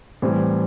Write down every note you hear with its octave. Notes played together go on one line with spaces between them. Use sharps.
A2 E3 G3 C4